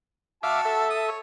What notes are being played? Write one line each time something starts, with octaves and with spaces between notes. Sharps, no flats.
F#4 E5 F5 A5 D6
A4 E5
D#6
C#5